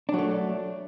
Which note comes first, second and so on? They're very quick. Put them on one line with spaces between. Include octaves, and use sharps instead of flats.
D4 F#3 A3